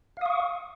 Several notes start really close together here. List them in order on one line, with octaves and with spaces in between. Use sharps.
F5 D#6 C#6